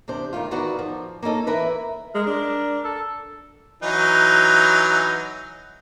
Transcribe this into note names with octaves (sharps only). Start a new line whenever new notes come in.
E2 C3 D4 C5
D#3 G3 A3 F4
E2 D#3 D#4 F#4 B4 D5
F3
A#3 C#4 D#4 A4
E3 A#4 B4 E5
G#3 A#4
D4
A4
E3 F#3 D#4